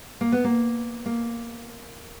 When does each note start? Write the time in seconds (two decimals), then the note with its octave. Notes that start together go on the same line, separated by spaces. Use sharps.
0.21 A#3
0.32 B3
0.44 A#3
1.06 A#3